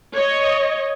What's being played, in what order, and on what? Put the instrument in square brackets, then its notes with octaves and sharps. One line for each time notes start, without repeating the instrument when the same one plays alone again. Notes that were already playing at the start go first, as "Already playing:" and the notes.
[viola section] C#5 D#5